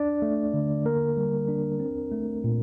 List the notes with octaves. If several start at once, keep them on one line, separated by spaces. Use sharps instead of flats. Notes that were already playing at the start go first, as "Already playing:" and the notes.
Already playing: D4 D5
A3
D3
A#3 A#4
G3
D4
C4
A3
A#2